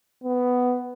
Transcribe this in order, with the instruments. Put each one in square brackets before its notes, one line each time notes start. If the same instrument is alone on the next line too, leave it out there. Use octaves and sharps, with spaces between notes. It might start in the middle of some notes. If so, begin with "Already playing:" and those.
[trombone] B3